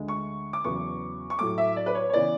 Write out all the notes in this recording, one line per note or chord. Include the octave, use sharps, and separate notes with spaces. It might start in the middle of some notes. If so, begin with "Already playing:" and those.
Already playing: D2 D3 G#3
C#6
D6
E2 C#3 F#3 B3 C#6
C#6
A2 F#3 A3 D6
E5
D5
B4
C#5
C#5
C#3 E3 B3 D5